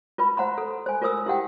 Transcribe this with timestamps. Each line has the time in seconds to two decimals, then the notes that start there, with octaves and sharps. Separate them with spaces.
0.18 F4 B4 B5
0.37 C5 F#5 A#5 C6
0.58 A4
0.86 C5 G#5
1.02 F4 A#4 C5 D#6 E6
1.26 E4 G4 F#5 G5